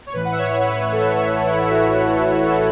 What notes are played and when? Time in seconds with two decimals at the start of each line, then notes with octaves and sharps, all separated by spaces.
0.07 C#5
0.13 A1 A2 E3 B4
0.25 F#5
0.32 E5
0.39 C#5
0.65 B4
0.92 A4
1.17 E5
1.45 E4
1.64 E4
1.70 F#4
2.10 A4
2.43 A4
2.50 F#4